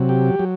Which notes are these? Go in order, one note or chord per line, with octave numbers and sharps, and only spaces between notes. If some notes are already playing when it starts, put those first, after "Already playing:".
Already playing: C3 F#3
G4
F#3